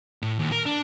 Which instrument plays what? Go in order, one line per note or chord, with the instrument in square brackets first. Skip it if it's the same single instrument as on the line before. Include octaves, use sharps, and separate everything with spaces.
[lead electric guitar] A2
D#2
A#4
D4